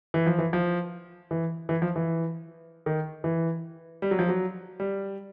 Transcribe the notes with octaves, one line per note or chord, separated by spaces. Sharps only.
E3
F3
E3
F3
E3
E3
F3
E3
D#3
E3
G3
F#3
F3
F#3
G3